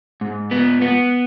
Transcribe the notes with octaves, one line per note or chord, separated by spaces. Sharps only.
G#2
B3
B3